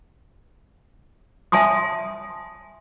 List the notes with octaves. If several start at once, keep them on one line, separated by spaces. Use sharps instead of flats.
E5 G#5 A5 C6 D#6